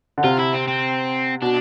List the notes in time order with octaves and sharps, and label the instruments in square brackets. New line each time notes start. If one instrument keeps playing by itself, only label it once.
[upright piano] D3
[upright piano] C3 [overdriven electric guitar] F4
[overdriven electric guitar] E4
C4
C4
[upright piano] B2 [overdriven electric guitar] D4